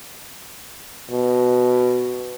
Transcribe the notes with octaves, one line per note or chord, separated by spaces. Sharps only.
B2